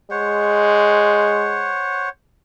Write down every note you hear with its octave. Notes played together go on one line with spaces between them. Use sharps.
G#3 C5 C#5 F#5